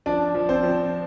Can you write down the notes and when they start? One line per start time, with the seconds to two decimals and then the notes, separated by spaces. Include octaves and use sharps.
0.06 F3 D4 D5
0.35 F3
0.49 C4 C5
0.63 F3